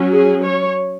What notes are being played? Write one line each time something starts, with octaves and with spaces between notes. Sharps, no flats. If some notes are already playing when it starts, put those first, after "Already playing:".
Already playing: F#3 C#4
G#4
C#5